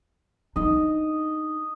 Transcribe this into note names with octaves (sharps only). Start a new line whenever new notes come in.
D4 D#4 D#5